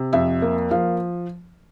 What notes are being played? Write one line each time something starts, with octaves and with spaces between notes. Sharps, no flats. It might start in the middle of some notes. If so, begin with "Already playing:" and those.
Already playing: C3
F2 E5
A#3
F3 F5